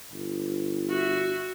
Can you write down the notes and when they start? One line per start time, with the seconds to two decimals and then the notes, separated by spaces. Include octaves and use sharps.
0.12 G1
0.89 F#4 E5